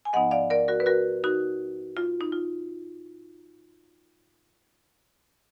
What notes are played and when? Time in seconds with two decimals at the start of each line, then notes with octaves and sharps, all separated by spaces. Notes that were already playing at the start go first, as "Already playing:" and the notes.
0.05 G#5
0.13 G#2 F3 B3 D#4 D#5 F#5
0.31 D5 F5
0.50 A#4 D5
0.68 F#4 A#4
0.80 B4
0.86 F#4 A#4
1.24 D#4 F#4
1.97 F4
2.21 D#4
2.32 F4